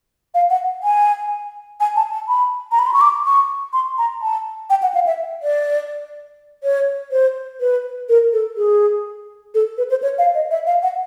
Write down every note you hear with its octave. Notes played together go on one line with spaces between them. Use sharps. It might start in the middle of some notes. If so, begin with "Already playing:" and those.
F5
F#5
G#5
G#5
A5
A5
B5
A#5
B5
C6
C#6
D6
C#6
C6
A#5
A5
G5
F#5
F5
E5
D5
C#5
C5
B4
A#4
A4
G#4
A4
B4
C5
C#5
F5
D#5
E5
F5
F#5